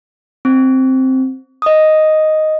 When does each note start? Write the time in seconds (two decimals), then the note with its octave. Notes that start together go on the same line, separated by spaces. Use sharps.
0.45 C4
1.62 D#5 D#6